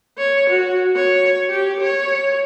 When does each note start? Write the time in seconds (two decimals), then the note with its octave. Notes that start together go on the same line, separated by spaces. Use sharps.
0.18 C#5
0.50 F#4
0.96 C#5
1.49 G4
1.81 C#5